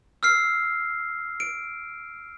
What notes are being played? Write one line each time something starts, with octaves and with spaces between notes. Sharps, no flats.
E6 F6 C7
D7